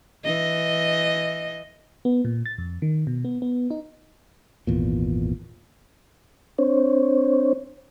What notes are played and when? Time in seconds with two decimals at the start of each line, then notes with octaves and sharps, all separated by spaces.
0.24 E3 D#5
2.05 B3
2.25 A#2
2.46 A6
2.58 F2
2.82 D#3
3.07 B2
3.25 B3
3.42 B3
3.70 D#4
4.67 G#1 E2 A#2
6.58 C4 D4 C5 C#5